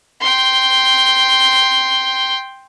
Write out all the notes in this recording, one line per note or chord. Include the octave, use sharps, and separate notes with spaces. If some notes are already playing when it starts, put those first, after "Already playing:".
G5 C6